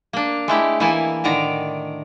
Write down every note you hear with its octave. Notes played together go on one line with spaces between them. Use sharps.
A#3 D4
G#3 A3 E4 G4
E3 A#3 E4 G#5 A5
A2 D3 D#3 D5 A#5